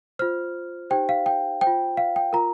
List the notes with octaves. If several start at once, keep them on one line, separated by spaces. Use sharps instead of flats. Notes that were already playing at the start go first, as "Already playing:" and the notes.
F4 C5 F6
D#4 G4 C5 G5
F5
G5
C5 G5
F4
F5
G5
F4 A#4 A#5